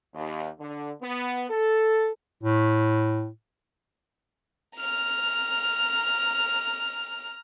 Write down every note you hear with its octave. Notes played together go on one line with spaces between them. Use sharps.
D#2
D3
B3
A4
A2
A#5 F6